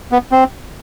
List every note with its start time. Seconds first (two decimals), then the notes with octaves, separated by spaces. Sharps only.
0.12 B3
0.32 C4